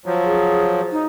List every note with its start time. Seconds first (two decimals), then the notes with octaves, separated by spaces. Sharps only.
0.06 F3 F#3
0.25 G#4
0.92 D#4